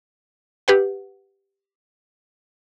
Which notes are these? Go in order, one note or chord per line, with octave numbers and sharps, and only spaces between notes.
G4 B4 F#5